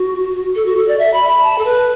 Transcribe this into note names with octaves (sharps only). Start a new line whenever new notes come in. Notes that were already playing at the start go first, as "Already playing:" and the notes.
Already playing: F#4
A4
F#4
A4
D5
E5
B5
B5
A5
A4
B4